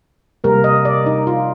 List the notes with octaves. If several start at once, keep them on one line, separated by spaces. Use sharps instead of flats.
C3 G3 A#3 A#4
D#5
D5
D#4
F4